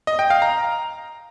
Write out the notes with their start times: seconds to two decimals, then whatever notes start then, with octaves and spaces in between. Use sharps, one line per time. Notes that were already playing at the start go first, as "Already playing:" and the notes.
0.07 D#5
0.19 G5
0.30 F5
0.42 A#5